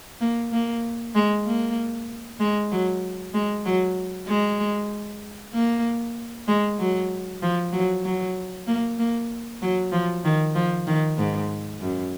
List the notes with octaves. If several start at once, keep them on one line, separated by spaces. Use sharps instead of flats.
A#3
A#3
G#3
A#3
G#3
F#3
G#3
F#3
G#3
A#3
G#3
F#3
F3
F#3
F#3
A#3
A#3
F#3
F3
D#3
F3
D#3
G#2
F#2